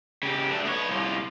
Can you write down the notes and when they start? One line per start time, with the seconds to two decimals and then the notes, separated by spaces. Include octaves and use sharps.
0.23 C#3 G4
0.50 A3 D4
0.65 B3 C#5
0.89 C2 F4